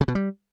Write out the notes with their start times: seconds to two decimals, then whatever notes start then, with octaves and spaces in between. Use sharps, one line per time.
0.01 C#3
0.08 B2
0.15 G3